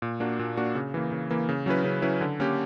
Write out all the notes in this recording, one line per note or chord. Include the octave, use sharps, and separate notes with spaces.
A#2
A#3 D4 F#4
A#2
A#3 D4 F#4
C#3
E3 A#3
C#3
E3 A#3
C#3
F#3 C#4 E4 B4
C#3
F#3 C#4 E4 B4
D3
A#3 C#4 G4